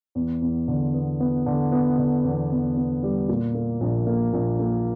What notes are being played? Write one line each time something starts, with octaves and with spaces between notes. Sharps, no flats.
E2
E2
D3
B3
B3
D3
B3
D3
E2
E2
B3
G3
A#2
A#3
A#1
A#3
A#1
A#3